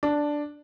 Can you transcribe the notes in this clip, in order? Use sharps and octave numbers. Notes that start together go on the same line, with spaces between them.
D4